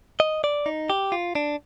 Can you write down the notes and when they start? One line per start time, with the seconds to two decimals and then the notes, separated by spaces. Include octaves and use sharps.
0.20 D#5
0.44 D5
0.66 D#4
0.90 G4
1.12 F4
1.35 D4